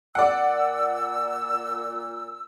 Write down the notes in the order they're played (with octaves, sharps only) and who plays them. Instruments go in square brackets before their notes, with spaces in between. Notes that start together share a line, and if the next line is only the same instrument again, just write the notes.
[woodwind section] A#2 E6 [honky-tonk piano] D5 F#5